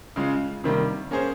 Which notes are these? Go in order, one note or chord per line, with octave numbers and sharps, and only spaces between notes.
C#3 G#3 C#4 F4
C3 D#3 G3 A#3
A#3 C#4 G#4 C5